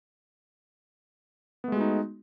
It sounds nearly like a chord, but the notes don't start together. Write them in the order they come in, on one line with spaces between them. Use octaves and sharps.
B3 A3 G#3 F#4 D#4